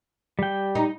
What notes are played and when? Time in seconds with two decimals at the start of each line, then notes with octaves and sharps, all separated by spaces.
0.39 G3 G5
0.75 D#4